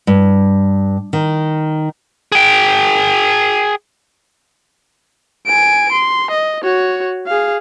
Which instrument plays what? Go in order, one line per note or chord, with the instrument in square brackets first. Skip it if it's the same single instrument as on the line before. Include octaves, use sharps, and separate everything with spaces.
[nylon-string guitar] G2
D#3
[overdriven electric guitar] G#4 G5
[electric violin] G#5 D7
C6
D#5
F#4 C#5
G#4 F5